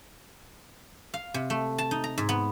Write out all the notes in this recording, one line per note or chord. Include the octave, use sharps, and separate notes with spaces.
F5
C3
A3
A5
D#4
A#5
G#2
B3